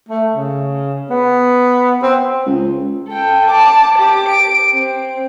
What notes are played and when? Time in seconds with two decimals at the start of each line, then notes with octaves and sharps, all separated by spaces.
0.09 A3
0.34 C#3
1.10 B3
2.03 C4
2.46 C#2
3.08 A4 G5
3.50 A5 D6
3.98 G4 D6
4.29 D7
4.72 C4